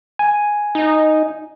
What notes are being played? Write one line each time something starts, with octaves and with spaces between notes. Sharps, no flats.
G#5
D#4